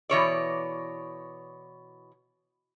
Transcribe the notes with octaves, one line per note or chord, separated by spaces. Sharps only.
B2 E3 C#5 D5